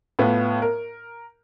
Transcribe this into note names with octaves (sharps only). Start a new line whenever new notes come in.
A2 B3 F4
A#4